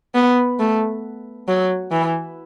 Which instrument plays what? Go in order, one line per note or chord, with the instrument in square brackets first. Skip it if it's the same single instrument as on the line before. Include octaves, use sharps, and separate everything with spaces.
[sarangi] B3
A3
F#3
E3